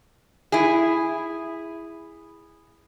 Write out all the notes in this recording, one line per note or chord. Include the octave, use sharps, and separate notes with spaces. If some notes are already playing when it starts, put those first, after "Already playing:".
E4 G#4